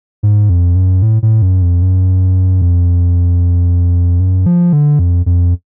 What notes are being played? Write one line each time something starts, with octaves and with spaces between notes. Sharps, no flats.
G#2
F2
F#2
A2
A2
F#2
F2
F#2
F2
F#2
F3
D3
F2
F2